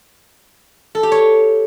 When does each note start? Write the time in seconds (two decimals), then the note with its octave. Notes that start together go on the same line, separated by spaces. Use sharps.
0.95 A4
1.03 G4
1.12 C#5